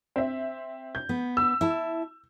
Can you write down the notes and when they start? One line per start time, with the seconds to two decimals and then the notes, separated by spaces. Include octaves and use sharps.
0.16 C4 E5
0.95 G6
1.09 B3
1.37 E6
1.61 E4 A5